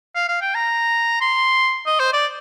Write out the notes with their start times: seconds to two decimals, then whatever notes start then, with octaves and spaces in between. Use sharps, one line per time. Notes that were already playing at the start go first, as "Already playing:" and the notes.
0.15 F5
0.28 F5
0.41 G5
0.54 A#5
1.21 C6
1.86 D#5
1.99 C5
2.13 D5